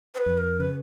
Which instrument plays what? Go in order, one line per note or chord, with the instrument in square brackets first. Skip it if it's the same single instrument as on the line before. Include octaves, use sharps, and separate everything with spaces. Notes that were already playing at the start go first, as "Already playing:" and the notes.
[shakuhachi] C5
B4
[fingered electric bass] F2
[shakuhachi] A#4
[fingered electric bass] C#3 [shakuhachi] B4